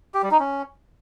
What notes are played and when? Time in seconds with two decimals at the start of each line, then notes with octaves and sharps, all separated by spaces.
0.14 G4
0.23 G3
0.31 D#4
0.40 C#4